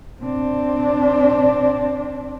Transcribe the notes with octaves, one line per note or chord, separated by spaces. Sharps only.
C4 D4